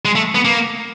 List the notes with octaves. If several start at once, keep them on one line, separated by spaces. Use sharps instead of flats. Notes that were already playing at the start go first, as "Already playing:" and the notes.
G#3
A3
B3
A#3